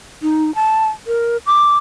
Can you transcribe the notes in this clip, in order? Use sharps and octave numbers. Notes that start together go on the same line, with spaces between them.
D#4
A5
A#4
D6